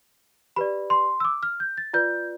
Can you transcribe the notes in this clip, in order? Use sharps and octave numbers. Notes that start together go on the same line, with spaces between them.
G4 B4 D5 B5
C6
E6
D6
F6
G6
A6
F4 B4 D5 G6